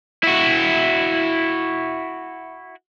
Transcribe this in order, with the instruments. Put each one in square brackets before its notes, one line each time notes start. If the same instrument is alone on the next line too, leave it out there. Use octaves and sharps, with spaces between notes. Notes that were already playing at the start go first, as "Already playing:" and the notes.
[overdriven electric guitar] E4 F#4